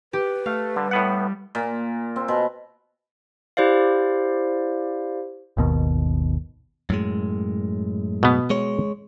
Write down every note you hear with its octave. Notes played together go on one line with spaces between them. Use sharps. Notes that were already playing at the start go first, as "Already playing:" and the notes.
G4 B4
A3 F5
D3 G3
A2 B3 F#5
A#2
C4
B2
E4 G4 C5 D5 F5
G#1 D#2 B2 D#3
F#2 A2 G#3
B2 B3
G#3 C#5